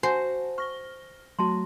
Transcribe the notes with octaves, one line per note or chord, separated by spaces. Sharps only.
F#4 C5 F#5 G#5 A5
C#6 F6 A#6 G7
F#3 A3 F#4 A5 C6